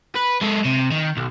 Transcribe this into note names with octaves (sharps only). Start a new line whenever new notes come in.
B4
G#3 A4
C3
D#3
B1